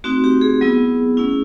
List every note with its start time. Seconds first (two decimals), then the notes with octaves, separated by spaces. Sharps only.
0.04 A3 C4 D#4 F#4
0.24 G4
0.41 G#4
0.61 F#3 B3 E4
1.17 A3 C#4 E4